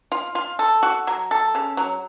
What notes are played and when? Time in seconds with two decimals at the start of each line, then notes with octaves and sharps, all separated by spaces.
0.12 F4
0.35 F4
0.59 A4
0.83 F#4
1.07 F#3
1.31 A4
1.55 C#3
1.77 F#3